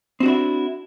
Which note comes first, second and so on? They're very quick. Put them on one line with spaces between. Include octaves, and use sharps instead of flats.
C4 F#4 D4 E4